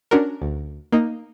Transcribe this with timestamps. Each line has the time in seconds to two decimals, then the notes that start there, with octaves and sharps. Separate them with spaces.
0.11 C#4 D4 F#4 A#4
0.42 D2
0.92 A#3 D#4